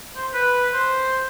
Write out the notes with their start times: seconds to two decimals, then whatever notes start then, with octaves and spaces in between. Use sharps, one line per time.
0.16 C5
0.33 B4
0.73 C5